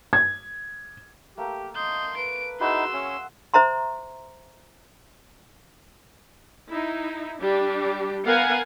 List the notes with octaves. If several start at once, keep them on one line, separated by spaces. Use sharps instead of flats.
G#6
A3 A#3 G4
D#5 C6 G6
B4 D7
D#4 E4 F#4 G#4 F#5 C6 E6
C#4 E5
C5 E5 A#5 C6
D#4 E4
G3 D4 G4
B3 A#4 F5 F#5 G#5